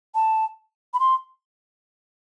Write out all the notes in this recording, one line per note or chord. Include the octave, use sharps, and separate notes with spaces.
A5
B5
C6